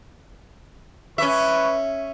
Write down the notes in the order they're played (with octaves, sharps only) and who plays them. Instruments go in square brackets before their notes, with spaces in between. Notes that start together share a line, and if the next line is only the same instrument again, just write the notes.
[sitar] C#4 E5 [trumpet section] B4 C#6